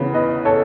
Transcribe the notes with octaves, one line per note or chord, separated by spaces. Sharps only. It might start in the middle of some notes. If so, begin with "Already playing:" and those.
Already playing: E2 C#3 E3 B3
B4 D#5
A4 C#5